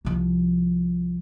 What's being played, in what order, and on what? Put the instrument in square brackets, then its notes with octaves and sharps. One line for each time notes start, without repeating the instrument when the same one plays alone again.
[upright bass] C2 F3